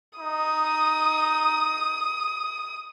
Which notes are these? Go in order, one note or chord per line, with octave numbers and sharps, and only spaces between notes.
D#4 D#6